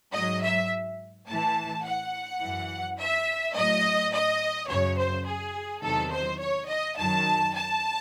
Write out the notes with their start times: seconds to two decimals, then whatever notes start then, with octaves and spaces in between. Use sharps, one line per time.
0.13 G#2 F#3 D#5
0.42 E5
1.27 A2 E3 A5
1.84 F#5
2.41 F#2 E3
2.98 E5
3.55 A2 F#3 D#5
4.13 D#5
4.68 F#2 C#3 F#3 C#5
4.98 C5
5.26 G#4
5.82 E2 C3 D#3 F#3 A4
6.12 C5
6.40 C#5
6.68 D#5
6.97 F#2 D#3 F#3 A5
7.54 A5